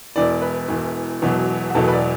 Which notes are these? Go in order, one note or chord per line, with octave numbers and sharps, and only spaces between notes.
E1 E2 E3 D5
B4
E1 E2 E3
E1 E2 B2 F#3
F#4
E1 E2 B2 F#3 A4
B4
D5